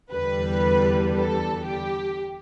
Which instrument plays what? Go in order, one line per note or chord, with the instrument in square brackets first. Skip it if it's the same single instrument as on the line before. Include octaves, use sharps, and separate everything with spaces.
[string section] E2 D3 G3 B4
A4
G4